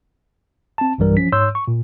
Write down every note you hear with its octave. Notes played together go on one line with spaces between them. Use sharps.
C4 A5
B1 G2 E3 G3 A#4
F3 C#4 B6
G#2 C#5 C6 E6 G6
C#6
A#2